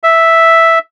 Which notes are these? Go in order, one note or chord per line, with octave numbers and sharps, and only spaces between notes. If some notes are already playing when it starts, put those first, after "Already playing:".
E5